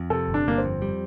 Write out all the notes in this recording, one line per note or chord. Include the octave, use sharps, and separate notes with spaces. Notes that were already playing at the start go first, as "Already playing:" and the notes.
Already playing: F2
C3 A4
G1
D4
G1 A#3
C4
F2
G3